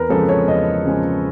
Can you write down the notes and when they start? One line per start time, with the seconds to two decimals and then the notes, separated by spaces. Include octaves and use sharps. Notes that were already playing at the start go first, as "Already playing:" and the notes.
Already playing: E2 A#4 B4
0.09 C#3 F3 G#3 A4
0.29 C#5
0.47 E2 D#5
0.85 C#3 F3 G#3